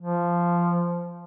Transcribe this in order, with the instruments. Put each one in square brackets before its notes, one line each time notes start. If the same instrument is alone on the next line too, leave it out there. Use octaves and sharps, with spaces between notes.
[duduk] F3